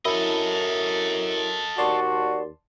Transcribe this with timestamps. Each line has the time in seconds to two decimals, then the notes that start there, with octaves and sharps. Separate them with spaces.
0.05 F#2 E4 A4 D#5
1.78 D#2 F#4 D5 A5 C6